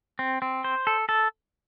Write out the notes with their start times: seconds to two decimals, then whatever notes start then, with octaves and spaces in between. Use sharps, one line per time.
0.19 C4
0.42 C4
0.64 C5
0.87 A4
1.09 A4